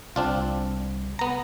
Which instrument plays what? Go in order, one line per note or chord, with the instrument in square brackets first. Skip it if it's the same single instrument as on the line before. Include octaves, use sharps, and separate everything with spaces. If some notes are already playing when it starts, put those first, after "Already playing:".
[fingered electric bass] C2 [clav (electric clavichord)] C4 D4 F4
[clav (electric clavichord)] B3 A#5